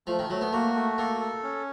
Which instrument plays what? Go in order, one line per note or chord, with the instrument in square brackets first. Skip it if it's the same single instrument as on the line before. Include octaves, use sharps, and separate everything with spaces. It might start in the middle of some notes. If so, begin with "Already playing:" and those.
[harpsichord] F3 [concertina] A3
[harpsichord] D#3
[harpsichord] F#3 [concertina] A3
[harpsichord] B3
[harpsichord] A#3 [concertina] F#4
[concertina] A3
[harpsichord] A#3 [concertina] A4
[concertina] A4
C#4